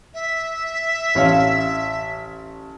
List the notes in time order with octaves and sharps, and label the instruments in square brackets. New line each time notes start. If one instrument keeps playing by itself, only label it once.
[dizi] E5
[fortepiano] A1 C#5 F5